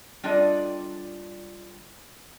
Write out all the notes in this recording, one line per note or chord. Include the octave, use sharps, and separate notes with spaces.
G3 D4 F4 A4 D5 D#5